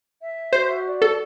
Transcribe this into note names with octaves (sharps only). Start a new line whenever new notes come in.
E5
F#4 C5
D5
A4